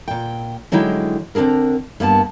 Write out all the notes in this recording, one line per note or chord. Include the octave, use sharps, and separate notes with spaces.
A#2 G5
D3 F#3 G#3 D#4 E4 G5
D3 C4 D4 G#4 A#4
G2 A#3 B3 A5